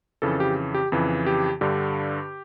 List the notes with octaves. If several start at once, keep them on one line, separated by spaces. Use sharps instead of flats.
F2 C#3 E3 A4
G4
G4
F2 C#3 E3
G4
G2 D3 G4